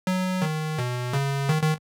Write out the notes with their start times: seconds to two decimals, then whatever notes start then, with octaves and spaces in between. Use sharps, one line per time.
0.07 F#3
0.42 D#3
0.78 B2
1.13 C#3
1.49 D#3
1.63 D#3